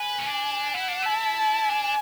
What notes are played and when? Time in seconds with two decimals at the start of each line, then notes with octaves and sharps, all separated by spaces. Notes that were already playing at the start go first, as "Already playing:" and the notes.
Already playing: B4 G#5
0.19 C#4
0.27 D4
0.74 E4 F#5
0.88 D4
1.02 E4 A5
1.37 A5
1.69 D4 G#5